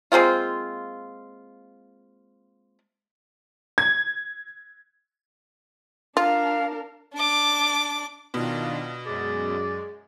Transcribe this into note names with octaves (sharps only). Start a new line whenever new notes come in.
G#3 A#3 C4 F4
G#6
D4 F4 A#4 F5
D4 D6
B2 D#3 D4 F4
F#2 G#3 G#4 D5